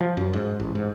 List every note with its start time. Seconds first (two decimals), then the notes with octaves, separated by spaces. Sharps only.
0.01 F3
0.17 F#2
0.33 G#2
0.60 A1
0.75 G#2